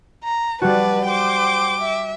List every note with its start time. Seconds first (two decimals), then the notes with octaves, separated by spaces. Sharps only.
0.24 A#5
0.62 G3 F#4 B4 D5 A5
1.06 C5 G5 D6
1.80 E5